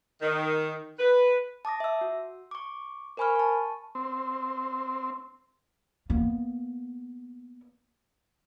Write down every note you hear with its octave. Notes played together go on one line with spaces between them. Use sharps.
D#3
B4
A5 D6 D#6 A#6
E5 E6
F#4
C#6 D6
A#4 C5 G#5 B5 C#6 F6
A5 C#6
C4
A#3 B3